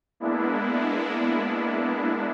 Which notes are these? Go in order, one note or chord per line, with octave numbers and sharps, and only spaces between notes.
G#3 A#3 B3 D4 E4